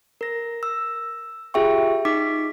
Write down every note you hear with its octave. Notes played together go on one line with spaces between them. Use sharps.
A#4 A#6
E6
F4 G4 G#4 E5 G5 C#6
D#4 D6 B6